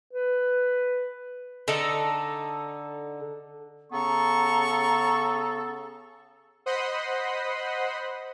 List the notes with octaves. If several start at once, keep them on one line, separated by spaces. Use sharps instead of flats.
B4
D3 D#4 A4
C#3 B3 A4 A#5 C#6
C5 D#5 F#5 B5 C6 D#6